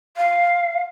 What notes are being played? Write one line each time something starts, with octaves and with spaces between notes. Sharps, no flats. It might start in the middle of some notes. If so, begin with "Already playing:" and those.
F5